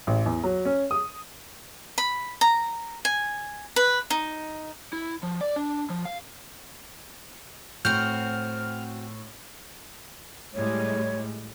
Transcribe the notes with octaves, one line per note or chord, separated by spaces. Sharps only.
A1
E2
F#3
C#4
D#6
B5
A#5
G#5
B4
D#4
E4
F3
D5
D4
F3
F5
A2 C4 F#4 F6 G6
A2 G3 G#3 C#5